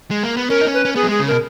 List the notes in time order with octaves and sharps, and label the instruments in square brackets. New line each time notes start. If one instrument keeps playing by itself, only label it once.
[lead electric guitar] G#3
A#3
B3
[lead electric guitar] C#4 [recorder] A#4
[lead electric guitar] D#4
C#4
[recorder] B4
[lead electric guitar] C#4
[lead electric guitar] B3 [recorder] G#4
[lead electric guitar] F#3
[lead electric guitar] G#3 [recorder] G#4
[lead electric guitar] C#3
[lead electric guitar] B2 [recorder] A#4